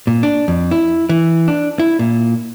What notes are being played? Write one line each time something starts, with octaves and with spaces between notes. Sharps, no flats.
A#2
D4
F2
E4
E3
D4
E4
A#2